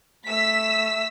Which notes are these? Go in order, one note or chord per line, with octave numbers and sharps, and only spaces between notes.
A3 E6 B6